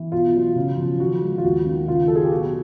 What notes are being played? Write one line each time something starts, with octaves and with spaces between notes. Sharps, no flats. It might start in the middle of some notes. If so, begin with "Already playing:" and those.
Already playing: E3
B2 F4
F#3
C#3
F3
D#3 F#4
G#3
F4
D#2 F#4
D#3
C#3 F4
F#3 A4
G#4
G4
B2 F#4